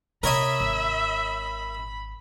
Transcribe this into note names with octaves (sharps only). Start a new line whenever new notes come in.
C3 A#4 C#5 D#5 E5 B5
G#1